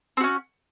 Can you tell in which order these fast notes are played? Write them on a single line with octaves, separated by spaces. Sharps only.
C4 F#4 C#4